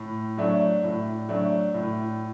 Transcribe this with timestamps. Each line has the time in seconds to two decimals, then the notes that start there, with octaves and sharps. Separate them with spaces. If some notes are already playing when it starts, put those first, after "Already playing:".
Already playing: A2
0.38 F#3 A3 D4
0.83 A2
1.29 F#3 A3 D4
1.74 A2